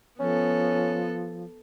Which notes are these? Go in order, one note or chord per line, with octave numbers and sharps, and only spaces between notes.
F3 B3 C#4 A4